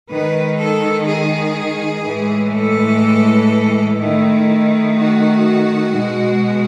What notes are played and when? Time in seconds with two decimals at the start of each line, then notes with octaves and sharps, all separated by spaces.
0.10 D#3 G#3 B4
0.59 A4
1.08 G#4
2.05 A2 E3 G#3
2.54 A4
4.00 D#3 A3 E4
4.98 F#4
5.95 B2 G#3